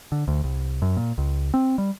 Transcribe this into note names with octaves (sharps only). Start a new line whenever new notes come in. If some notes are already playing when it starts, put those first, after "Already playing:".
D3
D2
C2
F#2
A#2
C#2
C4
G3